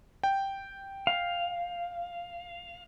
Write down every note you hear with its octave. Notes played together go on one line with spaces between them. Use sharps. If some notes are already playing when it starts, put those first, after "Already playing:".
G5
F5